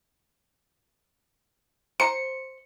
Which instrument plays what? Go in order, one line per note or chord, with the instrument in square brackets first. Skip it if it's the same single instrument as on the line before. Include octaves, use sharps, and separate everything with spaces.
[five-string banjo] C5 A#5 [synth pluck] C#7